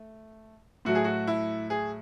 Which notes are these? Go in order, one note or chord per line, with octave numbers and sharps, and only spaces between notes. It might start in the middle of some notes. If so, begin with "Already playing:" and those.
Already playing: A3
A2 F#3 A3 F#4
G#4
F#4
E4
G#4